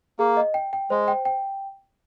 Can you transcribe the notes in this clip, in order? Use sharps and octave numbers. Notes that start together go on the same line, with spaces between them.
A#3 G#4
D#5
G5
G5
G#3 C5
G5
G5